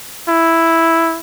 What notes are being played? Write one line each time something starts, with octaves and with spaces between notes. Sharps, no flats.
E4